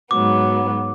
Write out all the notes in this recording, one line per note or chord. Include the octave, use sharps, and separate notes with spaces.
G#2 F#3 B3 D6